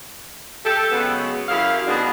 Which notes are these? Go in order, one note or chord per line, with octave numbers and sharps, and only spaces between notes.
G4 A4
C#3 F#3 G#3 B3
F#2 E4 G4 G#4 F5
B2 D#3 G#3 B3 D4 F#4